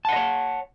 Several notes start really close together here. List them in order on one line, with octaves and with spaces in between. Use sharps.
A5 F#5 D#5 C#5